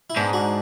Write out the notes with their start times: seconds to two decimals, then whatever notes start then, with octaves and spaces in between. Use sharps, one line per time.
0.10 E4
0.16 G#2 B3 D4
0.33 D4 F#4